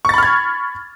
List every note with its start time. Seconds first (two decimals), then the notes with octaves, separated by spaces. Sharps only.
0.05 C#6
0.09 A6
0.14 B5
0.18 F6
0.23 G#6